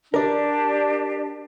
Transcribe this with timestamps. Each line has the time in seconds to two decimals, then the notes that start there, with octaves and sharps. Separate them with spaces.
0.14 D4 G4 A#4 D5